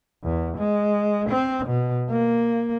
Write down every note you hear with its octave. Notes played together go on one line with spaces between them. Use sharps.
E2
G#3
C4
B2
A#3